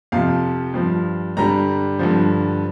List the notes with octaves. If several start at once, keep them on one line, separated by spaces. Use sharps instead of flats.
F2 C3 F3 F5
G2 F3
G2 D3 G3 A#5
G2 D3 F3